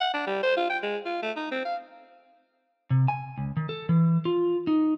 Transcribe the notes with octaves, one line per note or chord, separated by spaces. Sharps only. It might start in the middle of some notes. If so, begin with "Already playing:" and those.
F#5
D4
G3
C5
F4
G5
G#3
F4
A3
D#4
C4
F5
C3
G#5
C#2
D#3
A4
E3
F4
D#4